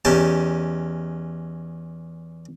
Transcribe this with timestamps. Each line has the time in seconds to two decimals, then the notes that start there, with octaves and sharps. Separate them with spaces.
0.05 E2 C#4 D#4 G4 A5